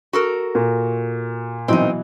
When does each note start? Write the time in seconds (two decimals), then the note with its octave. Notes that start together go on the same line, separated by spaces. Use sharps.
0.13 F#4 A4 A#4
0.55 A#2
1.68 B2 E3 F#3 C4 D#4